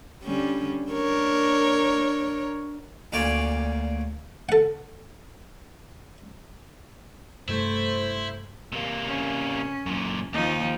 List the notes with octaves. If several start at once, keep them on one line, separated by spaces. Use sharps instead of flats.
D3 G3 C#4
D4 A#4 C#5
D2 A#2 C#4 C#5 D5 D6
A4 F#5
G2 C3 G3 A3 E4 C5
C3 A#3
C#4
F#2 A#2
D#2 F3 D#4